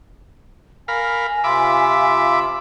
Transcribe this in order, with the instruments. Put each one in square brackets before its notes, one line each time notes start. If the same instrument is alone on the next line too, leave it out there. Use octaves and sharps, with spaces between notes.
[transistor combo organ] A#4 F5 B5 [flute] G#5
[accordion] C3 F4 [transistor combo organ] E5 B5 D6